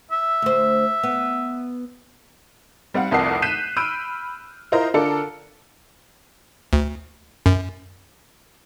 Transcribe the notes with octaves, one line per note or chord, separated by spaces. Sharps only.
E5
D2 C5
B3
G3 C4 F5 F#5
F1 C2 F2 A#4 F#5 C7
F#6 G6 B6 C7 D#7 E7
B5 E6 F6 G6 D7 D#7
E4 F4 A#4 C5 D#5 A#5
D3 F4 A4 A#4 D5 C#7
D2
F#2